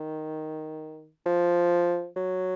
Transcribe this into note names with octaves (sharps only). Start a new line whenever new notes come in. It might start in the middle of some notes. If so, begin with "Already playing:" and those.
Already playing: D#3
F3
F#3